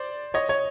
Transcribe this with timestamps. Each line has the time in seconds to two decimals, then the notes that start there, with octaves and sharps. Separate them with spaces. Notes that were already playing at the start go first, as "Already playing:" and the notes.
Already playing: C5 D5
0.34 C#5 D#5
0.49 C#5 D#5